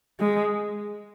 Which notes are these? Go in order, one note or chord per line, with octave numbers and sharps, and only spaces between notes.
G#3